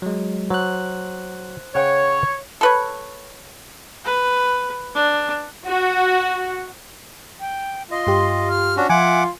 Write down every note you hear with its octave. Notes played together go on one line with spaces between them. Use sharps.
F#3 G#3
F#3 C5 F#6
C#3 C#5 F#5 G5
A4 B4 C#5
B4
D4
F#4
G5
F4 D#5 C6
G2 G4
F6
C#4 D4 F#4
F3 F4 E5 F#5 G#5 D6